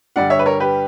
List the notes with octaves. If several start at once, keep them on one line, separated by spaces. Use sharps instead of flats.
G2 D3 G3 D5 F#5
C#5 E5
B4
A#4 C#5
G4 B4